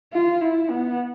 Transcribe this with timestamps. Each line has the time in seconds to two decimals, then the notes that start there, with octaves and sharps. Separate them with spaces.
0.13 F4
0.41 E4
0.70 B3